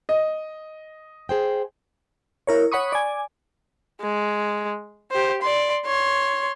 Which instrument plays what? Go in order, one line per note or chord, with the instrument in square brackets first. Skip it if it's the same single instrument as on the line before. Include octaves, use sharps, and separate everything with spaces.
[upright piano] D#5
[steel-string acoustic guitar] G#4 C5 G5
[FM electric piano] E4 A#4 C#5
C#5 F#5 B5 C#6 D#6
D5 G#5
[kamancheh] G#3
G4 C5
D5 C6
C#5 C6